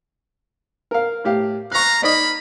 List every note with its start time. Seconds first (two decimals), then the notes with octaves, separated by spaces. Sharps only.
0.91 A#4 F5
1.24 A2 G4 F5
1.72 F5 A#5 C#6 F#6
2.02 A#3 D#4 D5 D#5 B5